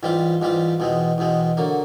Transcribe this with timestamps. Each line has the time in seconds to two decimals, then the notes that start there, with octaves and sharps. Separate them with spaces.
0.03 G#2 E3 G3 C4 F4
0.42 G#2 E3 G3 C4 F4
0.80 E2 B2 G#3 C4
1.18 E2 B2 G#3 C4
1.57 D3 F#3 A#3